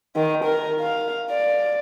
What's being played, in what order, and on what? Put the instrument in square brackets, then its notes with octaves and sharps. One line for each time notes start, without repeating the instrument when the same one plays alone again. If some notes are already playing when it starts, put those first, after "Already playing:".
[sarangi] D#3
A#4
F5
D5